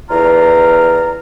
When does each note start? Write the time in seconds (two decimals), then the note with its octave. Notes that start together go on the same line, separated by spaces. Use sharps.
0.09 E2 D3 F4 A#5